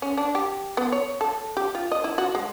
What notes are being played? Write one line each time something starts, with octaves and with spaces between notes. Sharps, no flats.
C#4
D4
G4
B3
C#5
A4
G4
F4
D#5
E4
F#4
G#3